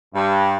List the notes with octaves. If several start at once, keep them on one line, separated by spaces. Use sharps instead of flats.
G2